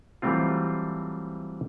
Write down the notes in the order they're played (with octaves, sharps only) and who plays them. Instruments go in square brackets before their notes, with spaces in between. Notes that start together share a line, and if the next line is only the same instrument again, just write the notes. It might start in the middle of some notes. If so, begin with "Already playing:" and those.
[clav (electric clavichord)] E3 F#3 G3 A3 C4 F4